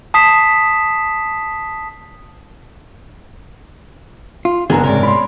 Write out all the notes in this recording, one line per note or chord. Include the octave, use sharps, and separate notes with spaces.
A5 D#6 B6 C7 E7
F4
F#1 B3 D4 G#4 A#5
G#2 C3 A#4 C#5 D5
B5 C6